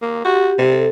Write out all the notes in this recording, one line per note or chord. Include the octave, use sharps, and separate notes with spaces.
A#3
F#4 G4
C3
A4